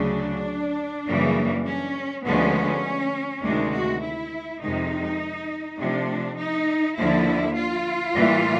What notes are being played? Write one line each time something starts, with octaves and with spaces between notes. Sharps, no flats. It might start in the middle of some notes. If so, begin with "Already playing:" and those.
Already playing: D2 C#3 F#3 D4
F#2 C#3 E3 G3 A#3
C#4
D2 D3 F3 G#3 B3 C#4
D2 C3 D#3 G#3 D4
F#4
E4
F2 C3 D#3 G#3 D#4
C3 F3 A3 D4
D#4
D#2 D3 F3 A#3 E4
F4
A2 E3 G3 A#3